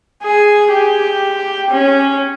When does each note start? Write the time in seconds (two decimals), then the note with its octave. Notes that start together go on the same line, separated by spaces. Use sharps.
0.23 G#4
0.72 G4
1.71 C#4